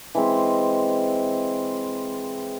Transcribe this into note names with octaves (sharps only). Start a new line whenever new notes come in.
E3 G#3 C4